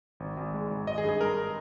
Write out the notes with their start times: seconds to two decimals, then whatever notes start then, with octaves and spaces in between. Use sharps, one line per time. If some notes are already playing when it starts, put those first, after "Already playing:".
0.20 G#1
0.37 G#1
0.54 G#3
0.71 G#1
0.87 G#1 D#5
0.98 G#4
1.04 G2
1.09 G#4
1.20 G#3 A#4